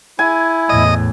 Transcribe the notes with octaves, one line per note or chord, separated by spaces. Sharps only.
E4 G#5
E2 A2 D#5